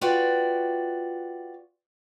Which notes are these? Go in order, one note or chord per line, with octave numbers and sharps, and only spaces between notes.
F4 F#4 B4 D5 G5